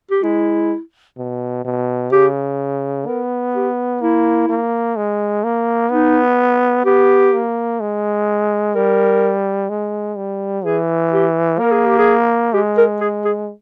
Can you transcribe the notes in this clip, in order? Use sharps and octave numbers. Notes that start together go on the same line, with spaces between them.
G4
G#3 E4
B2
B2
C#3 G4
B3 A#4
G4
A#3 E4
A#3
G#3
A#3
B3 D#4
B3 G4
A#3
G#3
G3 A#4
G#3
G3
E3 G#4
G4
A#3 A#4
G#4
G4
G#4
G#3 G4
A#4
G#4
G#4